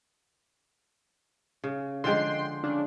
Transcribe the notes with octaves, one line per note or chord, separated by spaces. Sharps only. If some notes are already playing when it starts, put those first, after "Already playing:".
C#3
D3 F3 G#3 G5 C6
C#3 D4